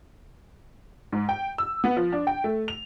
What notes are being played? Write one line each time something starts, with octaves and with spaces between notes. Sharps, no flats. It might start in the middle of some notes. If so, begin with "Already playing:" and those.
G#2
G5
E6
B3
F3
D4
G5
A3
F7